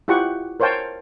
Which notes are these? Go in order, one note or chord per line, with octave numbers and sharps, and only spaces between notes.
E4 F4 G4 F#5 C#6
A#4 C5 C#5 F5 G5 A5